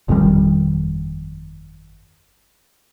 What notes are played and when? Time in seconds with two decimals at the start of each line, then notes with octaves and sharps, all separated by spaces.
0.09 G1 F2 D#3 G3